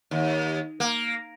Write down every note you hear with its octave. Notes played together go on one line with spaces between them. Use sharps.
D#2
A#3